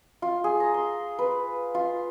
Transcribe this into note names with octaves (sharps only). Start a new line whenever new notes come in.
F4
G#4
A#5
C6
B4
F4